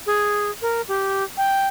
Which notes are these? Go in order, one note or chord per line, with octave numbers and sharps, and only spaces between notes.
G#4
A#4
G4
G5